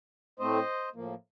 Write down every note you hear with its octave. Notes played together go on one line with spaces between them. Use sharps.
A2 A3 C4 C5 D#5
A2 F3 A#3